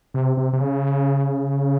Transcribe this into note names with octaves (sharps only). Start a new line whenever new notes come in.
C3
C3
C3
C#3